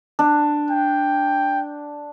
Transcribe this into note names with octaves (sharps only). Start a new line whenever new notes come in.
D4
G5